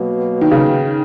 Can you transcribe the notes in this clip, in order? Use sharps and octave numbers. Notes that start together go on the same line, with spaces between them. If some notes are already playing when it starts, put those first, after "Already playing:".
Already playing: B2 F#3 A#3
D#3
C#3